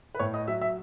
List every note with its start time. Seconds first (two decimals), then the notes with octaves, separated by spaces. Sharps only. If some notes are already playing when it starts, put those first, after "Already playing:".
0.15 B4
0.19 A2 C#5
0.34 D#5
0.48 F#3 E5
0.61 E5